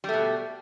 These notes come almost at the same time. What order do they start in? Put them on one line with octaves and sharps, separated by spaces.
G3 A3 B2